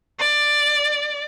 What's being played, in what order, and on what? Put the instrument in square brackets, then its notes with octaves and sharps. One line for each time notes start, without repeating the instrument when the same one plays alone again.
[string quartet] D5